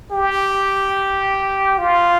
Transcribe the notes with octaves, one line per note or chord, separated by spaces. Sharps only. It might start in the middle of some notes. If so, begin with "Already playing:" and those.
G4
F4